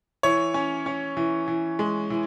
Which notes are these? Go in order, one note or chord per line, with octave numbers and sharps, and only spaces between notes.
E3 C#5
C#4
C#4
E3
E3
G#3
E3